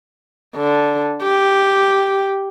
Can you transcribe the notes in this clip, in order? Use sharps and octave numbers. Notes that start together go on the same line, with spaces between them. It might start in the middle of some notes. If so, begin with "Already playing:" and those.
D3
G4